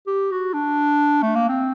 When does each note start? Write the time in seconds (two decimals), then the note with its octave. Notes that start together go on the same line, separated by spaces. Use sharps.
0.07 G4
0.32 F#4
0.54 D4
1.23 A3
1.35 A#3
1.49 C4